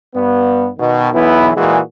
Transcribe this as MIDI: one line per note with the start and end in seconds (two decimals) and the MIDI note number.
0.15 0.69 43
0.15 0.69 59
0.79 1.09 47
0.79 1.09 51
1.13 1.51 35
1.13 1.51 52
1.13 1.51 59
1.13 1.51 64
1.56 1.79 46
1.56 1.79 52
1.56 1.79 56
1.56 1.79 66
1.56 1.79 68